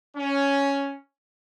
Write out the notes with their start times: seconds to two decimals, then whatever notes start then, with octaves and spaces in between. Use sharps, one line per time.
0.16 C#4